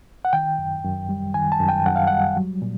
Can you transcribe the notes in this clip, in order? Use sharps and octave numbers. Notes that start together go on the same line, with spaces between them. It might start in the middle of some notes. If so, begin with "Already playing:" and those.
F#5
D#3 G5
F#2
F#2
G3
D#3 G#5
A5
F#2
G5
F#2 F#5
F5
G3 F#5
F#3
A#2